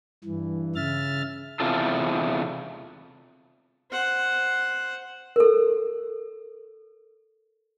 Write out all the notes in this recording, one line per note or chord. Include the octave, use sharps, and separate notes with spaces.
G2 E3
C#3 E5 F6 A6
E2 C3 F4 A4
C5 F#5
A4 A#4